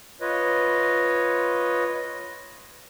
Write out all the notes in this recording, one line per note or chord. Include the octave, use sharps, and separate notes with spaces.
F4 B4 C#5 D#5